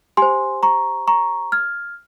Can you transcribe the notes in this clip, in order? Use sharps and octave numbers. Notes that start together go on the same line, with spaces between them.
G4 C5 G#5 C6
A#5 C#6
A#5 C#6
F6 G#6